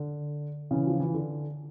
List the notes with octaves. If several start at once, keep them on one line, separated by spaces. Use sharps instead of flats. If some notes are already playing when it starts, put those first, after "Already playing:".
Already playing: D3
C#3 E3
F3
E3
D3